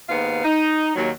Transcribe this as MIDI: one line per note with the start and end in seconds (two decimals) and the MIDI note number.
0.09 0.41 39
0.09 0.41 44
0.09 0.41 59
0.09 0.41 77
0.43 0.91 63
0.95 1.10 39
0.95 1.10 54